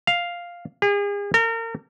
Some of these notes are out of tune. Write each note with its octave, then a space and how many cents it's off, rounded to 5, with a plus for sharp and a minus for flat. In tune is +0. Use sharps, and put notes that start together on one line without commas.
F5 +0
G#4 -40
A#4 -35